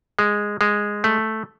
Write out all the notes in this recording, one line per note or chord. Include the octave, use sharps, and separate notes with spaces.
G#3
G#3
A3